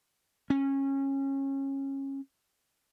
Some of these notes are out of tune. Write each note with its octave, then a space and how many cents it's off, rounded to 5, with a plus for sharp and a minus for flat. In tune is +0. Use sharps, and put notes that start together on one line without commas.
C#4 -20